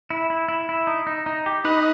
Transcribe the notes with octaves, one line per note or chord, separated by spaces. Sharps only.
E4
E4
E4
E4
D#4
D#4
D#4
G4
D#4 B4